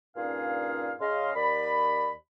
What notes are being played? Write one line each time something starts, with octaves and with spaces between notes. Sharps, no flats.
G2 A#2 C#4 D#4 G#4 F5
C#3 D#5 F5 C6
D#2 D5 B5